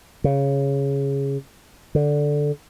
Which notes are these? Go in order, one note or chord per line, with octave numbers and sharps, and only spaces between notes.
C#3
D3